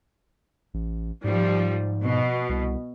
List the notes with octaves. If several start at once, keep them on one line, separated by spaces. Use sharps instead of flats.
A1
G#2 F3 G3
B2
C2